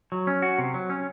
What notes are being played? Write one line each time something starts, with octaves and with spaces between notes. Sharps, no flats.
F#3
C#4
F#4
C3
F#3
C#4